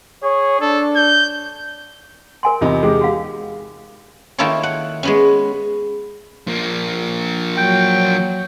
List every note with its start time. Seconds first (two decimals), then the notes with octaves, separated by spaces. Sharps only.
0.23 G#4 C#5
0.61 D4 A4
0.96 G6
2.43 A#4 G#5 C6
2.61 E2 C3 D#4 F4 A#4 B5
2.83 G#3 G4
3.01 F#4 F5
4.38 D#3 A#3 E4 F4 A4 C#5
4.63 F#5
5.03 G#3 B3 C#4
6.47 F3 A#3
7.57 F#3 G5